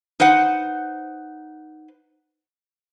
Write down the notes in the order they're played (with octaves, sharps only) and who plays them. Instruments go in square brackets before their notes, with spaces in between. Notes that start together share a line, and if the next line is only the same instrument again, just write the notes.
[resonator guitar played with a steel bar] D#4 B4 C5 F#5